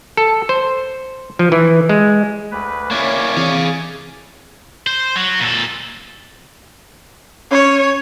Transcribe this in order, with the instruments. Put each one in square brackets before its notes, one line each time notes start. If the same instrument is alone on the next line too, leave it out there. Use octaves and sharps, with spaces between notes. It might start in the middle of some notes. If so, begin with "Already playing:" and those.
[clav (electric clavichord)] A4
C5
F3
E3
G#3
[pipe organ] D2 B4
[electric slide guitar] A#3 C#4 E4 [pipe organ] C#5 D5
[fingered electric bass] E3 C4 [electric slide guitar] G#4 F5
[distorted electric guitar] C5
F#3
A#2 A4
[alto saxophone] C#4 [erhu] C#5